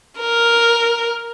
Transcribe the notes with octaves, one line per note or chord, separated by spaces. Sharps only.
A#4